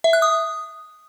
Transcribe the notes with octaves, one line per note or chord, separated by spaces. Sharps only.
E5
F#6
D#6